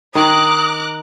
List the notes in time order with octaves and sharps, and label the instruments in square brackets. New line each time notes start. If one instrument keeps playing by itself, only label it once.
[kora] D#3 [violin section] A#5 D6 F#6 [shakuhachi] D#6